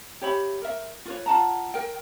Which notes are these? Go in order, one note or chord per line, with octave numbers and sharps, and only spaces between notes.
G4 C#5 E5 B5
A#4 E5
F4 B4 C#5
F4 F#5 A5 A#5
A#4 G5